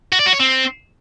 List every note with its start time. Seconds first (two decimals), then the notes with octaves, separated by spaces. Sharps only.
0.13 F#4
0.19 D5
0.26 F#4
0.33 C#5
0.40 C4